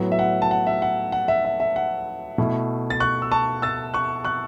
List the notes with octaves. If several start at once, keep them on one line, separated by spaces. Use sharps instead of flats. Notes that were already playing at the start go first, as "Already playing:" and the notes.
Already playing: A2 F#3 B3
E5
F#5
A5
F#5
E5
F#5
F#5
E5
E5
E5
F#5
B2 A3 E4
A6
C#6 F#6
E6
A5 C#6
E6 A6
C#6 F#6
C#6 F#6